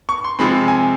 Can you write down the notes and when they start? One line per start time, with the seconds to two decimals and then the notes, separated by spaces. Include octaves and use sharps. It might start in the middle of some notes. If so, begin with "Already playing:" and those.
0.09 C#6
0.24 C6
0.39 C3 F3 G#3 C4 B5
0.68 G#5